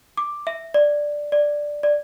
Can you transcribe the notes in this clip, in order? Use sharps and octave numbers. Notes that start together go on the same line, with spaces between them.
D6
E5
D5
D5
D5